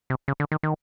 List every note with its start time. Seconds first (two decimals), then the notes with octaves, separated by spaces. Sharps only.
0.10 C3
0.28 C#3
0.40 D3
0.52 D#3
0.63 D#3